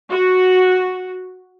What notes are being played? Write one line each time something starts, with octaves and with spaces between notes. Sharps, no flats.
F#4